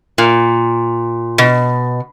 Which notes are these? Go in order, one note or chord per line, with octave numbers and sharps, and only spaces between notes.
A#2
B2